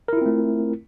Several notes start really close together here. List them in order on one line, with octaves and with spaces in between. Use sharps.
A#4 E4 F4 C4 A3